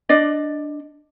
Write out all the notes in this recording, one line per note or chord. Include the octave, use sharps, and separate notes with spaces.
D4 D5 D#5